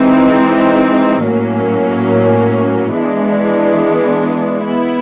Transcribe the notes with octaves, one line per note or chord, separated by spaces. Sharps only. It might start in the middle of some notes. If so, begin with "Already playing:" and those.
Already playing: E3 G#3 C4 D#4
A2 F#3 A#3 C#4
E3 G#3 B3 D4
B3 E4